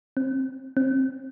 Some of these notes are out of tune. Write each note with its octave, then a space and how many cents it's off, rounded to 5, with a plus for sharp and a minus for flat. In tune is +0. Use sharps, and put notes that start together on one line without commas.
C4 +20
C4 +20